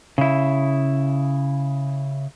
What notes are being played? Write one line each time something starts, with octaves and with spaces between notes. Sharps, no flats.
C#3 E4